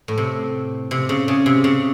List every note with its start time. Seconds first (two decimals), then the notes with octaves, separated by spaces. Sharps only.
0.08 A2
0.18 C3
0.91 C3
1.09 C#3
1.28 C#3
1.46 C3
1.64 C#3